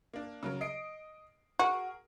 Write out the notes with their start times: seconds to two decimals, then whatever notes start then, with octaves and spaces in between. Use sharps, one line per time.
0.13 A#3 D4
0.43 C#3 F#3 A#4
0.61 D#5 C7 D7
1.59 F#4 G#4 A#4